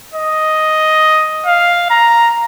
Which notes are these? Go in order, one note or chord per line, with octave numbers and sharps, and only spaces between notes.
D#5
F5
A#5